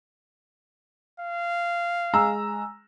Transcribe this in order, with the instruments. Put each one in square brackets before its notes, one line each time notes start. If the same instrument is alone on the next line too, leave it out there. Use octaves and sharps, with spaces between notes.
[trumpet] F5
[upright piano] G#3 A#5 E6